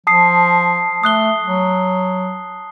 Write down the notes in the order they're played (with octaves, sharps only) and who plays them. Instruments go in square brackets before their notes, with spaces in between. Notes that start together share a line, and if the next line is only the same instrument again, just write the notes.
[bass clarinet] F3 [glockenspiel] A5 D#6 C7
[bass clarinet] A3 [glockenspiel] D#6 F#6 G7
[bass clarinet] F#3